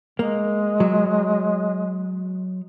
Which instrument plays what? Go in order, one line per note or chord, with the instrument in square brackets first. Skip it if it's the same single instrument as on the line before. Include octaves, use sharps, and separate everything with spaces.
[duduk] G#3 [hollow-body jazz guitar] A#3
[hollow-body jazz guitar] F#3